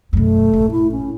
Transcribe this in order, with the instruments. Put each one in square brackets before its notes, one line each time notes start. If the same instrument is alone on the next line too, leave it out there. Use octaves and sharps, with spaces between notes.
[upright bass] F#2 B2 [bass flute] A3
[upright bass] A1 A#2
[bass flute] E4
C#4